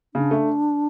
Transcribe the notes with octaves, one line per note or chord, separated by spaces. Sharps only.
C#3 D4
A3